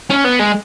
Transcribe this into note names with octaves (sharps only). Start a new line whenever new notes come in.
C#4
B3
G#3